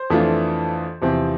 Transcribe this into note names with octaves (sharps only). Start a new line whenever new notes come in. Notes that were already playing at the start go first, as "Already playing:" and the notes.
Already playing: C5
F2 E3 A3 D4 F4
E2 C3 F3 C4